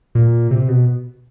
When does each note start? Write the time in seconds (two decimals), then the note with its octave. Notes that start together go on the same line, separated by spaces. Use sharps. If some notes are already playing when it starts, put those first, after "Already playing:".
0.15 A#2
0.51 C3
0.69 B2